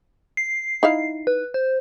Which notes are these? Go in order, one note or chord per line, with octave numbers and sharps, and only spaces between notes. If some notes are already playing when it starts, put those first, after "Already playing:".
C7
D#4 E4 F5
B4
C5